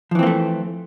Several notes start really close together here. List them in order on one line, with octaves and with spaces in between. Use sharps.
F3 E3 C4 A#3 A3